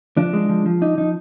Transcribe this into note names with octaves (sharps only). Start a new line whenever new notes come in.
F3 D4
G#3
F3
F3
D4 D#4
F3 D#4